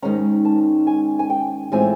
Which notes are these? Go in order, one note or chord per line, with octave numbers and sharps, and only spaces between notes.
G#2 D#3 G#3 C#4 A#5
A5
G#5
G#5
G5
A2 E3 G#3 C4 F4 G#5